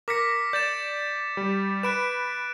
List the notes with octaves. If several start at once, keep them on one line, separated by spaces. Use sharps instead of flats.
A#4 D6 A#6 B6 C#7
D5 G6 A6 E7
G3
B4 B5 F#6 D7 E7